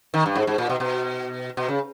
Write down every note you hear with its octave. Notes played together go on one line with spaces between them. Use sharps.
D#3
G2
G#2
G#2
A#2
B2
B2
B2
C#3